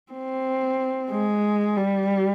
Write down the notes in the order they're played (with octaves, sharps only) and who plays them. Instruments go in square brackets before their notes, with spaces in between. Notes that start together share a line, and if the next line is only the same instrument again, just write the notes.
[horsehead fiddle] C4
G#3
G3